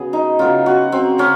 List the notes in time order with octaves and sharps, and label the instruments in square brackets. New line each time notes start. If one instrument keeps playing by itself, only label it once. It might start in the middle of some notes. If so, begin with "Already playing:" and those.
Already playing: [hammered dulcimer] C#3 F#3 B3 G#4
D#4
C#3 F#3 B3 F4
F#4
C4
C#3 F#3 C#4